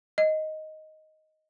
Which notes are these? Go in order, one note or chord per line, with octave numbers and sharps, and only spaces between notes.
D#5